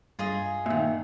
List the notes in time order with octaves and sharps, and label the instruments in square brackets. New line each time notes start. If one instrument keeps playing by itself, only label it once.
[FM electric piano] G2 [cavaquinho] F4 G#4 D#5
[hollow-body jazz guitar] A#2 D#3 [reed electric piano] E5